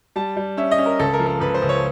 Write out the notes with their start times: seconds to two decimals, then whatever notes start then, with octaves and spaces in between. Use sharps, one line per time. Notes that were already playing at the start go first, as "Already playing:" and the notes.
0.16 G3 A5
0.37 G3
0.57 C#4 E5
0.71 D#5
0.78 C#4
0.86 A#4
0.99 C#2 A4
1.13 A#4
1.20 F3
1.27 A#4
1.40 C#2 B4
1.54 C5
1.62 C#2
1.69 C#5